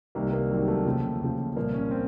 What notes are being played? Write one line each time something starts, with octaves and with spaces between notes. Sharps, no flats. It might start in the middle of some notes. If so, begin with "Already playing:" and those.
C2 C3 D#3 A#3
A#3
C2 C3 D#3 F#3
A3
D#2 C#3 F3
D#2 C#3 F3
C2 A#2 F3 A#3
C#4
C4